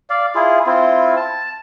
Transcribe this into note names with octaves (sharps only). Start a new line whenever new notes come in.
D5 F5
E4 F4 G#4
C4 E4 F4
A5